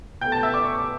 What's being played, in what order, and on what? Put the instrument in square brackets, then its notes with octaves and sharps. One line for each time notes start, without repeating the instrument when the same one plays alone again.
[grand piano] B2 G5 G6
A3
A5 A6
E5 E6
D5 D6
C#6
D6